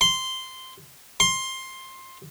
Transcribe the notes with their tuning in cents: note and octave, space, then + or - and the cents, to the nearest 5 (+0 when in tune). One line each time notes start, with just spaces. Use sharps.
C6 -5
C6 +15